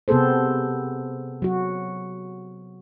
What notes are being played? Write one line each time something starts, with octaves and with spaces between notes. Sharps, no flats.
C3 B3 C4 G#4 A4 C5
F#3 F#4